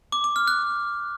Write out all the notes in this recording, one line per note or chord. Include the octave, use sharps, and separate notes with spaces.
D6
D6
F6
F#6